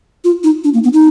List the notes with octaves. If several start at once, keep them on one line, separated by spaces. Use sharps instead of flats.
F4
D#4
D4
A#3
B3
D#4